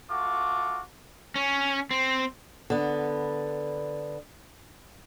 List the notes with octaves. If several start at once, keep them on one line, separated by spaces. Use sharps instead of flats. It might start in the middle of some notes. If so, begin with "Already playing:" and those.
A3 F4 F#4 D6
C#4
C4
D3 B3